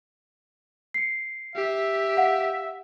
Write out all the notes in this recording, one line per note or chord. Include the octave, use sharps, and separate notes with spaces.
C7 C#7
G4 E5
F5 F#5